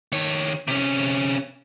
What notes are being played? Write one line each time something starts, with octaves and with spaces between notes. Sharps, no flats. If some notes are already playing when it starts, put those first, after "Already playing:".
D#3 C#5
C3 C#4